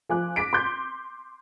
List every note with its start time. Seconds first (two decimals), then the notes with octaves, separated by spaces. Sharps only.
0.09 F3 G#5 D6 F#6
0.36 D6 A#6 B6 D7
0.53 C6 D6 G6